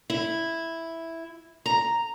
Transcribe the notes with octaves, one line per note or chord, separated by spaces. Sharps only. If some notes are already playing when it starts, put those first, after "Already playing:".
E4
A#5